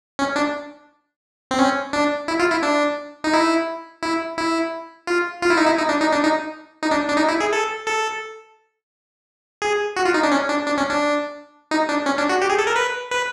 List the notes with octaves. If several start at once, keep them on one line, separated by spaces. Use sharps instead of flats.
C#4
D4
C4
C#4
D4
E4
F4
E4
D4
D#4
E4
E4
E4
F4
F4
E4
D#4
E4
D#4
D4
D#4
D4
D#4
D#4
D4
D4
D#4
E4
G#4
A4
A4
G#4
F#4
F4
D#4
D4
C#4
D4
D4
C#4
D4
D#4
D4
C#4
D4
F#4
G4
G#4
A4
A#4
B4
B4